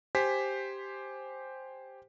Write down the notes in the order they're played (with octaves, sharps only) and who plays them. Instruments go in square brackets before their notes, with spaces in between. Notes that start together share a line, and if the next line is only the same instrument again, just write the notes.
[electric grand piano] G4 C5 G#5 B6